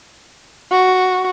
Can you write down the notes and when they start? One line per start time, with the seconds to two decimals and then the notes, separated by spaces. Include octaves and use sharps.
0.71 F#4